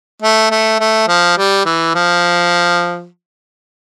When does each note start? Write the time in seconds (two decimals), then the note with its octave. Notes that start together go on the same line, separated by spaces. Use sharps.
0.22 A3
0.51 A3
0.80 A3
1.08 F3
1.37 G3
1.65 E3
1.95 F3